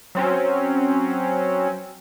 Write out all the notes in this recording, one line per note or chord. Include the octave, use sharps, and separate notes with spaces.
F#3 C4 C#4